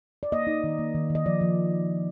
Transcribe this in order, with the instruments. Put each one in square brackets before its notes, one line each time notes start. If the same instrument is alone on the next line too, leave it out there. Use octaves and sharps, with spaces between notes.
[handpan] D5
A#3 D#5
D#4
D#3
A#3
D#3
D#3
D#5
F3 D5
F3